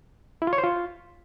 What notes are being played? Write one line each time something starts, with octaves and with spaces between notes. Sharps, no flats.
E4
F4
C#5
C5
F4